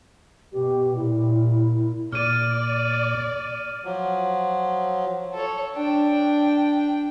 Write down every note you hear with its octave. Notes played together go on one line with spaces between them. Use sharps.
B2 G4
A#2 E4
A#2 D5 F6 D#7
F3 F#3
A4 C#5
D4 G5